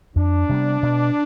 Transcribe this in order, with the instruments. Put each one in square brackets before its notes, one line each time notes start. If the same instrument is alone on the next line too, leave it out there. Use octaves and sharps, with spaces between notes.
[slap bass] F2 [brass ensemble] D4
[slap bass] C3 G3 B3
B2